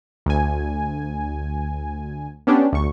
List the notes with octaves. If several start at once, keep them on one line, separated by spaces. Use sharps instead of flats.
D2 G#5
B3 C#4 D4 G4
D2 C#6